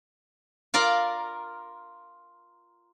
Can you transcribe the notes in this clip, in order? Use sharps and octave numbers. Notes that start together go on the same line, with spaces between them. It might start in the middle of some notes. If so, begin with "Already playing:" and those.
F4 A#4 D5 F5